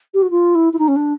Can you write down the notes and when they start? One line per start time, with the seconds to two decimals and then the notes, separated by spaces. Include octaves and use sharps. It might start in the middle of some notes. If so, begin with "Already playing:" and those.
0.14 G4
0.22 F#4
0.30 F4
0.55 E4
0.73 E4
0.78 D#4
0.88 C#4
0.96 D4